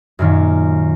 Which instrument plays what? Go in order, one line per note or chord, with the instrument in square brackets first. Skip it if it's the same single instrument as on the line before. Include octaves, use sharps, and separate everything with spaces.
[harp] F#2 A#2 D#3